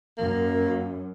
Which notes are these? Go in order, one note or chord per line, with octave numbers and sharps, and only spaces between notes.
F#2 A#3